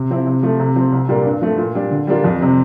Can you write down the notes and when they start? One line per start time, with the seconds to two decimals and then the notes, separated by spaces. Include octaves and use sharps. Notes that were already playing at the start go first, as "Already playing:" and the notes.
Already playing: C3
0.10 F3 C4 E4
0.27 C3
0.43 F3 A3
0.60 C3
0.76 F3 C4
0.92 C2
1.08 A#2 G3 A#3 D4
1.26 G2
1.41 F3 A3
1.58 A#2
1.75 G3 D4
1.91 D3
2.07 G3 A#3 D4 F4
2.24 F2
2.41 C3 G3 C4